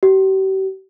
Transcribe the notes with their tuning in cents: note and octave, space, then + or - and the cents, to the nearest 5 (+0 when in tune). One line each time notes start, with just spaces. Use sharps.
G4 -40